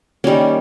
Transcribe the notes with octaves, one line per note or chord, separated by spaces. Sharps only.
D#3 G3 A#3 C#4